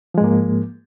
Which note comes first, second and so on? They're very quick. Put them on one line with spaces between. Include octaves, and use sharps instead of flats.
F3 G#3 G#2 A#3